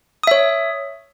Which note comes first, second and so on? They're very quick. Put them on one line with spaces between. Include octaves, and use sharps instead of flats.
D#6 E5 C#5